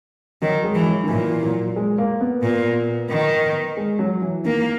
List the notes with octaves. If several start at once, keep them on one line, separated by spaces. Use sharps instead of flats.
D#3 F#3
G#3
E3
F#3
D#3
A#2 E3
F#3
G#3
A#3
B3
A#2
D#3
G#3
F#3
E3
D#3 A#3